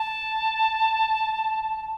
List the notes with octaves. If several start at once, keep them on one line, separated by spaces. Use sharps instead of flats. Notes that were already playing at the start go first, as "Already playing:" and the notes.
Already playing: A5